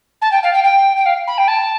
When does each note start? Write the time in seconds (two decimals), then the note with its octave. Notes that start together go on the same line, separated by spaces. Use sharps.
0.21 A5
0.31 G5
0.43 F5
0.53 G5
0.63 G5
0.96 G5
1.05 F5
1.27 B5
1.37 G5
1.47 A5